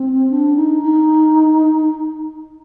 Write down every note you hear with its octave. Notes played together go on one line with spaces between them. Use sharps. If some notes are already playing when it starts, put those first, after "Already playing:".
Already playing: C4
D4
D#4
D#4